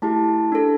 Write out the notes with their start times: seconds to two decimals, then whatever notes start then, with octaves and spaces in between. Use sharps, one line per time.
0.02 A3 E4 G4 A5
0.52 D4 A4